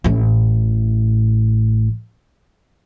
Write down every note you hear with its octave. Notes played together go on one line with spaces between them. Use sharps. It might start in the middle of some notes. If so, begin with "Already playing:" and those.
A1 A2